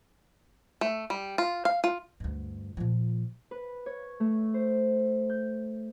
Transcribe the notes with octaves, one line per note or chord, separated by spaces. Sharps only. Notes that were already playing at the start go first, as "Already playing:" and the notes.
A3
G3
F4
F5
F4
D2 G2
A#2 F3
B4
C#5
A3
C5
G6